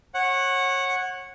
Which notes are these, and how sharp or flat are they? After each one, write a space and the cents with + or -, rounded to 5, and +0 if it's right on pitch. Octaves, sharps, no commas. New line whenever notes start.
C#5 -25 F#5 +0